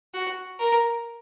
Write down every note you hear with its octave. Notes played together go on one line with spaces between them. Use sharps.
F#4
A#4